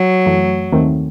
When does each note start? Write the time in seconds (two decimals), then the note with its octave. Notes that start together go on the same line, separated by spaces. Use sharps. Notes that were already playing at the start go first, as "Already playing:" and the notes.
Already playing: F#3
0.26 F#2 E3 A3
0.72 D#2 D#3 A3 C4